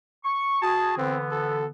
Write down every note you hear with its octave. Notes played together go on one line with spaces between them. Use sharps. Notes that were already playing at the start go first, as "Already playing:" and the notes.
C#6
F#4 G#4 A5
D3 E3 B3 C4
A4